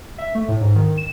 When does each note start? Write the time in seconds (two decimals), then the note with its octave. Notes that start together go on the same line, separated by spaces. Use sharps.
0.18 E5
0.35 A3
0.48 A2
0.61 G#2
0.75 D#3
0.97 E7